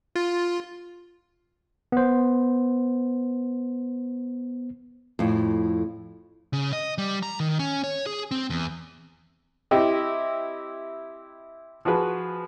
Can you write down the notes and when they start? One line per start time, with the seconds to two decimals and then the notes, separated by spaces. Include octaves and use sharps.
0.16 F4
1.92 B3 C5
5.19 F2 A2
6.53 C#3
6.73 D#5
6.98 G3
7.23 A#5
7.40 D#3
7.59 C#4
7.84 C#5
8.06 G#4
8.31 C4
8.50 E2
9.71 C4 E4 G4 D#5
11.85 F3 F#4 G#4 B4